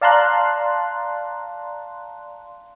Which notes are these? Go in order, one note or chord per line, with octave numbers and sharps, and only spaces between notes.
D5 F5 A5 A#5 C6 F#6